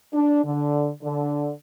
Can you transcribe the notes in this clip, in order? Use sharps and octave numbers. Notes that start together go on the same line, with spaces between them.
D4
D3
D3